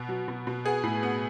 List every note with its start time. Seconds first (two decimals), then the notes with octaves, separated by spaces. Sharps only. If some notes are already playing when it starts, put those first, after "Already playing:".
Already playing: B2
0.09 F#3
0.28 B2
0.47 B2
0.65 B3 G#4
0.83 A2
1.03 B3